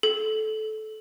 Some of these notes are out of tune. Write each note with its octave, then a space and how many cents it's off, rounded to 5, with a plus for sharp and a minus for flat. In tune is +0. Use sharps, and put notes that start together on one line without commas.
A4 -20